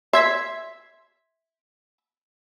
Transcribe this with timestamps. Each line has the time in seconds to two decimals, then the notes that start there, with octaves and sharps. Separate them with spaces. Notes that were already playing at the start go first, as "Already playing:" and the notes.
0.13 E5 C6 G#6 B6